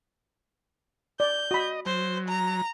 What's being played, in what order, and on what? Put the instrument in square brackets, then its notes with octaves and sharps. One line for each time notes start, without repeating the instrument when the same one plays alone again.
[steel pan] D5 [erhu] G6
[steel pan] F#4 B5 [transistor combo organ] D#5
[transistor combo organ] F#3 [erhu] C5
[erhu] A#5